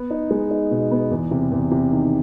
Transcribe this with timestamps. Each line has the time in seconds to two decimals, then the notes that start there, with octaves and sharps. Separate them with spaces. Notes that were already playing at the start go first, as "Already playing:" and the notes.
Already playing: B3
0.10 D#4
0.31 G#3
0.51 D#4
0.71 B2
0.91 B3
1.11 E2
1.31 C3
1.51 E2
1.71 C3
1.92 D#3